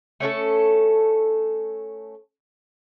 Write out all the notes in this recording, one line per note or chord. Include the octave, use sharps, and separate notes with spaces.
A3 C#4 F4 A4